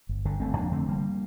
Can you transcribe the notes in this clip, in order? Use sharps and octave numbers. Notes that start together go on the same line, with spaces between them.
G1
G1 D3
G1 A3 C4
F2 A#3 D4
D3 A3 C4
F1 G3 A#3